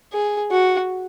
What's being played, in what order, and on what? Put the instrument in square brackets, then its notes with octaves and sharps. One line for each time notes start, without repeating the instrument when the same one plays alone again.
[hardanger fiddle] G#4
F#4